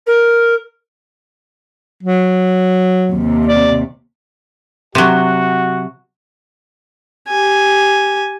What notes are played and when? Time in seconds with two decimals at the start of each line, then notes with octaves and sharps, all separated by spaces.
0.06 A#4
2.03 F#3
3.10 D#2 C3
3.47 D5
4.95 C3 F#3 F#4
7.28 G4 G#5